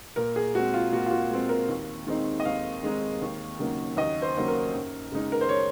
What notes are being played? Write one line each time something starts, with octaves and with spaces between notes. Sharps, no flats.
A#2 A#4
G#4
G#3 C4 F#4
F4
A#2 F#4
F4
F#4
G#3 C4
A#4
D#2
D#3 G#3 C4 D#4
D#5
D#2 F5
D#3 G#3 C4 D#4
D#2
C#3 F#3 A#3 D#4
D#2 D#5
C5
C#3 F#3 A#3 D#4
A#4
F#2
C#3 G#3 D#4
A#4
C5
C#5